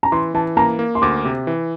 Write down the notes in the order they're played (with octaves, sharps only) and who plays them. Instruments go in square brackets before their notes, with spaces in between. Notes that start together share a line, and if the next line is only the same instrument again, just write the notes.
[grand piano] A#5
[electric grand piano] E3 [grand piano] C6
[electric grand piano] E3 [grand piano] A5
[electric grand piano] A#3 [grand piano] A#5
[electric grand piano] A#3
[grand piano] C6
[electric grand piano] D2 [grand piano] D6
[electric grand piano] C3
E3